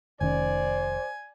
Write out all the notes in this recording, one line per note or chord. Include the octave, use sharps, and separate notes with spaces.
F1 D#3 C#4 C5 D5 G#5